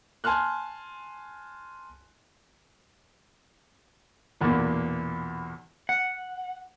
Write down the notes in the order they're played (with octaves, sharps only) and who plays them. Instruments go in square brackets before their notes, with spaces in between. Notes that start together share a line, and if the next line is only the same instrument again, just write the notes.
[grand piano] G#5 A5 C6 F6 F#6
[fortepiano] B1 E2 A#2
[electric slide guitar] F#5